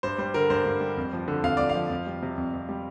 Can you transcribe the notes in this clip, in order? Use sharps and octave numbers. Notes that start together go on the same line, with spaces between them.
G2 C5
G3 C5
D3 A#4
G2 C5
G2
G3
F2
F3
D3
F2 F5
F2 D5
F5
F3
F2
G3
C3
F2
F2
G3